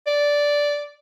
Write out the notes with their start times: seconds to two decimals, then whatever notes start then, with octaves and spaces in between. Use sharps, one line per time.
0.07 D5